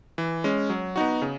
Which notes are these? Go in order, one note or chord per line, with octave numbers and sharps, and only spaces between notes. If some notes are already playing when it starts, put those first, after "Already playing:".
E3
G#3 C#4
F#3
B3 D#4 F#4
C#3